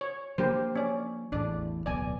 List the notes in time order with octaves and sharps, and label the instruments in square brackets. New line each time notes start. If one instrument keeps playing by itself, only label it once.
[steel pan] C#5
[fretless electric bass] F3 A#3 D4 [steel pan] G4 A#4 C5
[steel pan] C#4 D5
[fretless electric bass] A1 E2 A2 [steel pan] D4 D5
[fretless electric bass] D1 B1 B3 [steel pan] D5 G#5